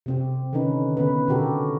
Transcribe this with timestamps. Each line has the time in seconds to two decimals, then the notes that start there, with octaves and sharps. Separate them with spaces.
0.06 C3 C4 G4
0.53 D3 D#3 C4 C#4 D#4 B4
0.97 D3 B3 C#4 B4
1.28 B2 D3 F#4 G4 A4 A#4